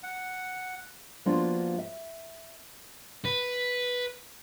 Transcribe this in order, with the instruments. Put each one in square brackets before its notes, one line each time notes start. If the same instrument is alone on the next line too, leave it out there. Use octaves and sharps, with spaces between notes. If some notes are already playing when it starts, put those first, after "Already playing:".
[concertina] F#5
[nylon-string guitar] F3 A#3 B3 D4 F4 F#4
E5
[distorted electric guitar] B4